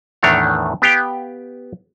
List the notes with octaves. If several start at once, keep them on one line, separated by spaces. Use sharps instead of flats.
E2 A2 D#3 A3 D4 C#5
B3 G4 F5 G5